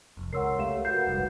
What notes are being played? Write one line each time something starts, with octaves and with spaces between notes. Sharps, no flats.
F1 C2
C#2 A#4 C#5 F#5 C6 E6 C7
A3 G4 F5 E7
F#4 A#4 B4 F#5 G6 C7
F1 C2 G#2